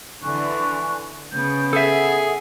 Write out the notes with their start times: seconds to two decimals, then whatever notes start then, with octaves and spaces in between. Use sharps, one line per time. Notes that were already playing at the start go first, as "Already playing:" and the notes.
0.23 D3 E3 G#5 C#6 F#6
1.32 C#3 B3 G6
1.73 G#4 A4 E5 F#5 D#6